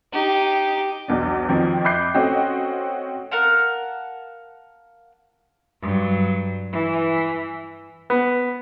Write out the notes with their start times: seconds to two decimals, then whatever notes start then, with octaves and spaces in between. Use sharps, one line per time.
0.13 D#4 G4
1.08 B1 E2 D4
1.48 F2 D#3 F3 C4
1.84 E5 B5 D6 F#6 G6 C7
2.14 A3 C4 C#4 F#4 D#5 G5
3.31 A#4 F5 F#5 A5
5.81 G2 F#3
6.72 E3
8.10 B3